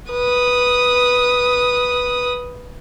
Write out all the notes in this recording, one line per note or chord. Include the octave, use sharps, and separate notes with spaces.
B4 D#6